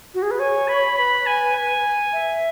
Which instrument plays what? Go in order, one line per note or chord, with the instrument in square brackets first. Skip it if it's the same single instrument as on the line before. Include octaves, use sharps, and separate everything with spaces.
[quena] F#4
G#4
B4
[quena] C#5 [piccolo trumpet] G#5
[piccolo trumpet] B5
[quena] B4 [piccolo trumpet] B5
[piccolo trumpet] G#5
G#5
[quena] E5